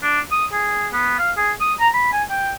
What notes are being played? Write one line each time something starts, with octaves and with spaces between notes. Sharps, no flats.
D4
D#6
G#4
B3
F5
G#4
D#6
A#5
B5
G#5
G5